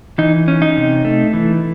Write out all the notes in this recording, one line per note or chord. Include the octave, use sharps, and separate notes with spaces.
E3 D#4
C#4
D#4
C3
A3
E3